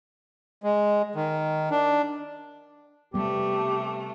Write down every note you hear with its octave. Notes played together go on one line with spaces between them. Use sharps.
G#3
D#3
D4
C3 G3 A3 B3 G4